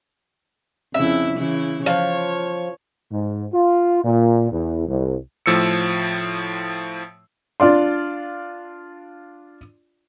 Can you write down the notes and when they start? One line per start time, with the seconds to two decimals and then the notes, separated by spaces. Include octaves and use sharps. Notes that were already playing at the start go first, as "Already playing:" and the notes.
0.94 F2 C#3 E4 E5
1.38 C#3 E3 E4
1.86 F3 C#5
3.12 G#2
3.53 F4
4.04 A#2
4.51 E2
4.87 C2
5.46 A2 F3 E6 C#7
7.60 D4 F4 D5 C6